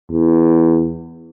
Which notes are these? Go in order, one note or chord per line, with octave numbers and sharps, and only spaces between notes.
E2